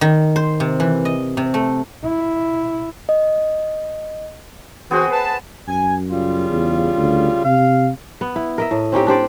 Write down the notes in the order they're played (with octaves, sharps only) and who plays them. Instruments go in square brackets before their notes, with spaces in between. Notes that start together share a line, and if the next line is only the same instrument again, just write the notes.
[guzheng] D#3
C5
C3
E3
D#5
C3
A3
[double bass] E4
[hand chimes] D#5
[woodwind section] E3 C4 F#4 [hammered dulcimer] B3 G#4 C5
[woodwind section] B4 A5
[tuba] F#2 [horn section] G#5
[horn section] C#3 G3 F4
[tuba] E2
D2
[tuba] C3 [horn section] F5
[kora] B3
E4
A#4 D#5 E5
A2
C4 C#4 D#4 G4
D4 G4 C5 D5